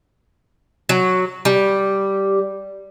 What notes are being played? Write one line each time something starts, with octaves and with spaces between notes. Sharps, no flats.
F#3
G3